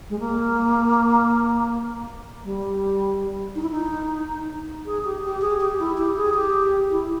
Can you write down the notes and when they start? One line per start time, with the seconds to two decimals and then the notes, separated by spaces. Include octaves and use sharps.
0.10 G#3
0.20 A#3
2.44 G3
3.55 D#4
3.62 E4
3.71 D#4
4.86 G#4
5.05 G4
5.24 G4
5.42 G#4
5.60 G4
5.80 E4
5.98 G4
6.17 G#4
6.35 G4
6.91 E4